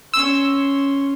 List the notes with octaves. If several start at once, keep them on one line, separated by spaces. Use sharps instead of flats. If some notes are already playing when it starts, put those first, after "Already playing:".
C#4 C6 E6